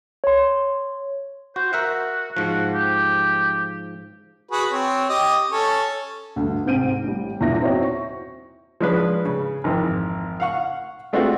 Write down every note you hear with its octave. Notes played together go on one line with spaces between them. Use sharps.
C#5 C6
F#4 C5
F#4 A#4 E5 F#5
G#2 F3 F#4
G4
F#4 G#4 B4
C4 C#5
G4 D#5
C#4 A4 C#5
D2 G2
G#2 C3 C4 G6 D7 D#7
A1 G3
E2 G2 A#2 E4 A#6
C4 D#4 E4 F#4 C#5
C#6
F3 G#3 C#4 D4 G#4 B4
C#3
G#1 F2 E3 C4
F5 F#5 C#6
G#3 A3 C4 D4 F4 F#4